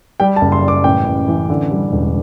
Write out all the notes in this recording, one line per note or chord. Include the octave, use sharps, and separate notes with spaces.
G3 G5
A5
F#1
C6
G3
D6
A1 G5
A1
E3
D3
G3
E1